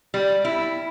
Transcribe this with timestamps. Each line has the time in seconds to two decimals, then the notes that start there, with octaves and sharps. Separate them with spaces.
0.14 G3
0.45 E4